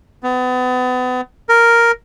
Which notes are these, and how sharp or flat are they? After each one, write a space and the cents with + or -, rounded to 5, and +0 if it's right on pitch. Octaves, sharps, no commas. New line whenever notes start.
B3 +35
A#4 +0